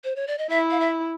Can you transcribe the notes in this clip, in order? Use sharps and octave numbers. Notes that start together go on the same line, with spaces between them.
C5
C#5
D5
D#5
E4 E5
F5
E5